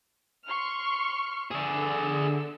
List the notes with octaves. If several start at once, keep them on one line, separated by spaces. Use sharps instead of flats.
C6 C#6 F6
D3 G#4 D5 E6